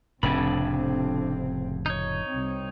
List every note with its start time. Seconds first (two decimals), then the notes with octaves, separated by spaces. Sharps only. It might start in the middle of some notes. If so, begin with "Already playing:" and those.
0.23 F1 F2 A2 C#3 C4 D4 B5
1.86 D#4 C#5
2.27 C2 C4